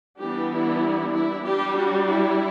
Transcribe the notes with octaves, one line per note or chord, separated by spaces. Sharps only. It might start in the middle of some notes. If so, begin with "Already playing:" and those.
E3 G3 B3 D4 G4
E4
E4
G3 D4 G4
F#4
E4